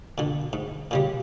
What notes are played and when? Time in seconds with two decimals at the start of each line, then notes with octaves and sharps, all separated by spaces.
0.18 A#2 D3
0.53 G#2
0.91 A#2 C#3 G3